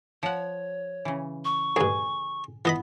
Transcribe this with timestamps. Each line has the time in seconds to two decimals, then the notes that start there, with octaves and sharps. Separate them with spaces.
0.23 F3 C#5 F#5
1.05 C#3 E3
1.45 C#6
1.76 D2 G2 G#4
2.65 E3 B3 D#5 B5